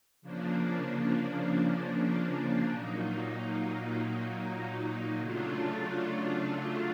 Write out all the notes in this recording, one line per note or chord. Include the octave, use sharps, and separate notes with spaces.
C#3 F3 A#3 D4
A#2 F#3 A#3 D#4
C#3 F#3 A3 D4 F4